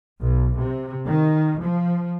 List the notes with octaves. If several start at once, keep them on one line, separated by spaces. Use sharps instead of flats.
B1
C3
D#3
F3